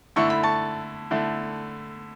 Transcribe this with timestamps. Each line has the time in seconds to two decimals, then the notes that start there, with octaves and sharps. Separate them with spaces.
0.16 D3 A3 E4 C#6
0.30 B5
0.43 A5 C#6
1.11 D3 A3 E4